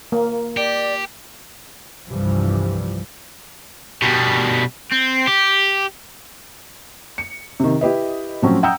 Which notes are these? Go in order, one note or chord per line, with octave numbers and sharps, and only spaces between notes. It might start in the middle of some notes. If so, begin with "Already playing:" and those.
A#3
G4 D5
C2 G2 E3 F3 G3
B2 G3
C4
G4
C#7
C3 D#3
E4 G4 B4 D#5
A2 F3 F#3 C4 C#4
F#5 G5 A#5 D#6 E6 G6